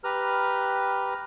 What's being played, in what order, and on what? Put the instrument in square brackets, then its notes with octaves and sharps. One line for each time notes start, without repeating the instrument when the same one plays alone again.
[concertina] G4 B4 A#5 F6